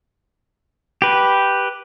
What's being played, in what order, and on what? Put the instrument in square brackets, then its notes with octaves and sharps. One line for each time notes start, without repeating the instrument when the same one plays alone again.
[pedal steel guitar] G4 B4